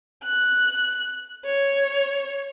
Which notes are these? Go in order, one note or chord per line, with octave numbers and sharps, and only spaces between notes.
F#6
C#5